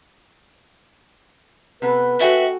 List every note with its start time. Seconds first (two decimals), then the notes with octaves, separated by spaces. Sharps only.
1.82 C3 B3 A4 B4
2.20 F#4 A4 E5 G5 G#5